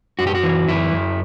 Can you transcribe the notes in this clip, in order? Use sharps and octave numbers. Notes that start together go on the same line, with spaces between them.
F#2 F#4
G4
F#4
E3
F#2 E4
F#2